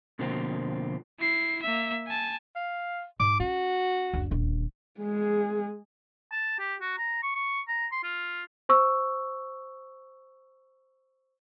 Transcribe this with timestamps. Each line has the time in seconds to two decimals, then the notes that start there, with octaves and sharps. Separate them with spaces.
0.19 B2 D3 F3 A#3 C4
1.20 E4 C7
1.63 A#3 E5
2.07 G#5 A5
2.56 F5
3.20 G#2 D6
3.40 C#4 F#4
4.13 F#1 D2
4.31 D#1 D3
5.00 G#3 G#4
6.32 A5
6.59 G4
6.81 F#4
6.98 A#5
7.23 C#6
7.35 C#6
7.68 A#5
7.92 C6
8.03 F4
8.69 C5 C#6 E6